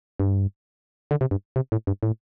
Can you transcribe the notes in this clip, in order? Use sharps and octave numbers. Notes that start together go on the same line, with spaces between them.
G2
D3
C3
G2
C3
A2
G2
A2